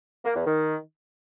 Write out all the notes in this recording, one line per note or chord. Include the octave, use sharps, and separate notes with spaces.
A#3
E2
D#3